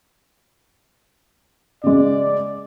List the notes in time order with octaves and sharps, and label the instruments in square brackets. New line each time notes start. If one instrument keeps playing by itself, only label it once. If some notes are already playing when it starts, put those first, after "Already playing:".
[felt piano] C#3 G#3 [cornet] D5